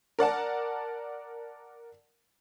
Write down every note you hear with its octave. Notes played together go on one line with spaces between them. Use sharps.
A#4 D5 F#5 A5